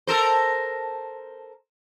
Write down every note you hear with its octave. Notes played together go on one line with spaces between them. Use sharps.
A4 A#4 C5